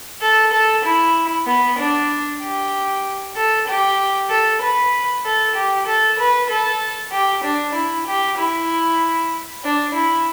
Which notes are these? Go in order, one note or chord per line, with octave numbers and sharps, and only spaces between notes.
A4
A4
E4
B3
D4
G4
A4
G4
A4
B4
A4
G4
A4
B4
A4
G4
D4
E4
G4
E4
D4
E4